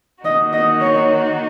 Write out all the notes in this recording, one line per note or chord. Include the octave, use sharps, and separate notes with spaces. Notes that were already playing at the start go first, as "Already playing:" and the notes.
D#3 A#3 D#4 F#4 D#5
D#5
C#5